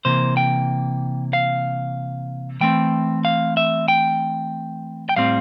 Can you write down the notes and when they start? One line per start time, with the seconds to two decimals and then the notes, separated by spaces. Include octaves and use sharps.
0.05 C3 E3 A#3 C5
0.37 G5
1.33 F5
2.61 E3 A3 C4 G5
3.25 F5
3.57 E5
3.88 G5
5.09 G5
5.17 A2 G3 C4 F5